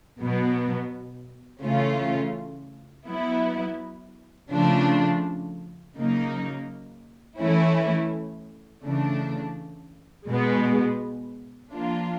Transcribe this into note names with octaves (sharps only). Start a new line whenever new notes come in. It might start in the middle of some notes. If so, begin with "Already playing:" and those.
B2 F#3 B3
C#3 E3 A3 C#4 F4
F#3 B3 E4
C#3 F3 A3 D4 F4
C#3 F#3 A#3 D#4
E3 A3 C#4 E4
C#3 E3 A3 D4
B2 G#3 B3
F3 A#3 D4 F4